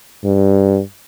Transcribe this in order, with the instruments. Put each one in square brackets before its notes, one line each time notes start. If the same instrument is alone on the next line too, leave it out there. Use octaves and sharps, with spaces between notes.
[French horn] G2